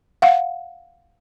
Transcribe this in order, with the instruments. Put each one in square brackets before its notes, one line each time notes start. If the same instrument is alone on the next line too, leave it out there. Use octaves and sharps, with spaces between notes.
[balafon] F5 F#5